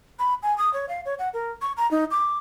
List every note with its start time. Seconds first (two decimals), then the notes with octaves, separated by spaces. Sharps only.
0.19 B5
0.43 G#5
0.58 D#6
0.73 C#5
0.89 F5
1.05 C#5
1.19 F#5
1.34 A#4
1.62 C#6
1.77 A#5
1.91 D#4
2.11 D6